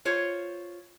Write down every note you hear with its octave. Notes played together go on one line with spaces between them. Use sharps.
F4 C5 C#5